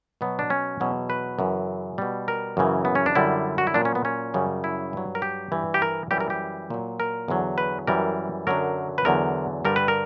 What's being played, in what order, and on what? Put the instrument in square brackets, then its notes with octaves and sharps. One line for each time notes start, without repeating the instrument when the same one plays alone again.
[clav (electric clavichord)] B2 F#3 B3
D4
C#4
E2 B2 F#3
B4
F#2 C#3 E3
B2 G3
A#4
F#2 C#3 E3
B3
C#4
D4
F#2 D3 G3 E4
F#4
E4
A#2 F#3 D4
C#4
B3
C#4
F#2 C#3 G3
E4
G2 F#3
A#4
G4
G2 E3 G3
G4
A#4
F#2 E3 G3 G4
A#4
G4
A#2 F#3
A#4
E2 D3 F#3
B4
F#2 E3 G3 A#4
F#2 D3 F#3 A#4
B4
E2 D3 F#3 A#4
G2 D3 G3 A#4
B4
A#4